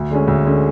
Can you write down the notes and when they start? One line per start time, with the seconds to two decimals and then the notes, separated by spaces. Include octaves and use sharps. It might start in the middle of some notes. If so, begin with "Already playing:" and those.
Already playing: D2
0.11 D3 G#3 C#4
0.28 D2
0.45 D3 G#3 C#4